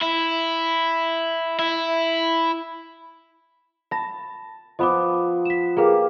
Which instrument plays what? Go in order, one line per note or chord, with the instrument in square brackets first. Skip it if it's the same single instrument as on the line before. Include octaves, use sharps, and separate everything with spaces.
[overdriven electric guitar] E4
E4
[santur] A5 [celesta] B5 A#6
[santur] F3 B3 D#6 [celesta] D#5 B5 D6
[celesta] B6 E7
[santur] A#3 G4 F5 [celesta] G#4 A#4 B4